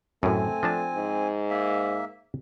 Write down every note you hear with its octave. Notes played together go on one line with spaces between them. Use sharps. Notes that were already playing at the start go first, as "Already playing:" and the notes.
F#2 A2 A3 C4 G#5
F3 D4 A5
G#2
A#3 E5